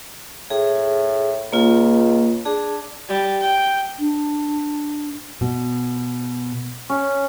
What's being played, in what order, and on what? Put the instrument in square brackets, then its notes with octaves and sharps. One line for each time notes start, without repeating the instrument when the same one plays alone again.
[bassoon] A2 [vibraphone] G#4
[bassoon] C#2 [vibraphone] A#3 F4
[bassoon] D4 [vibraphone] G#4
[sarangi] G3
G5
[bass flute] D4
[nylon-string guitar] B2
[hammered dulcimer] C#4